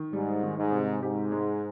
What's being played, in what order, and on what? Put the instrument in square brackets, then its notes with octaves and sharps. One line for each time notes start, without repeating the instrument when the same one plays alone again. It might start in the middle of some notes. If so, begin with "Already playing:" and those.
Already playing: [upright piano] D#3
[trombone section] G#2 [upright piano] G3
[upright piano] D#3
[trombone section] G#2
[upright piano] C3
[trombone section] G#2 [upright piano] G4
[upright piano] G#3